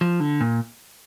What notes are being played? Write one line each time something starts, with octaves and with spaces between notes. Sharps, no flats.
F3
D3
A#2